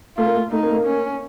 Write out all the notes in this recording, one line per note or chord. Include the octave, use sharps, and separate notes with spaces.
A3 F4
A#3
A3
A3 D#4
A#3
A3
A#3
C#4